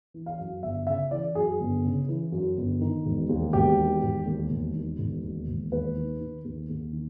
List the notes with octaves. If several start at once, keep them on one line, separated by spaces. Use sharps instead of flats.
E3
F5
F#2
G1 E5
C#3 E5
E3 D5
F#2 G#4
G1
C#3
E3
F#2
G1
D#3
E1
D#2
E1 G4
D#3
E1
D#2
E1
D#3
E1
D#2
E1
D#2 B4
D#3
D#3
D#2
D#2
D#3